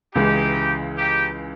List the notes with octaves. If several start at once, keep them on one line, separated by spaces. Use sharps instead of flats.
C#2 C#3 E3 G#3 D#4 G4
D#4 G4